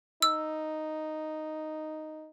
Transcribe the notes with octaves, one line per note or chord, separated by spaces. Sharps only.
D#4 E6